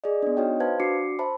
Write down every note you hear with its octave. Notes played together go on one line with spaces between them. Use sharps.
G#4 D5 D#5
B3 D4
D#4 F#4 C#5 D#5 G5
B4 C5 F5 A5 G#6
D4 F#4 D6 C7 C#7
C5 E5 A5 B5